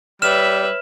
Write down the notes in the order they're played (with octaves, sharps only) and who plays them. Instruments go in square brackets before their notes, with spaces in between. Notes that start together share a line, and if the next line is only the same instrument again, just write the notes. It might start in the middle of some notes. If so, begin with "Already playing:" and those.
[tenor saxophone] G3 [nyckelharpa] B4 E5 [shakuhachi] C#5 [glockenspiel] F6 E7